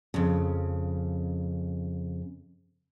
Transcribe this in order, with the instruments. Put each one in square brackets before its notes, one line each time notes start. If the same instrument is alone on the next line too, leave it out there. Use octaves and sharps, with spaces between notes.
[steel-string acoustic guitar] F2 C#3